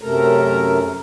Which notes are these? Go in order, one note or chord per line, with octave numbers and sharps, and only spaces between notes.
F#2 C3 A3 A4 A#4 A#5